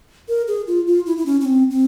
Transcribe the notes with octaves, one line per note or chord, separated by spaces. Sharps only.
A#4
G#4
F4
F4
E4
E4
C#4
C#4
C4
C4